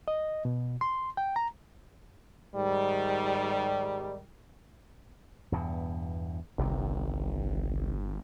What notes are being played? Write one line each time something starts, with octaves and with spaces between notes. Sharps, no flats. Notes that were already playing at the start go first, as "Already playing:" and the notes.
D#5
B2
C6
G5
A#5
G#2 D#3 G3
E2 G2 B2
G1 C2 C3 D#3